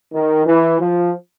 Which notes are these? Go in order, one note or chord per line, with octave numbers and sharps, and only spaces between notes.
D#3
E3
F3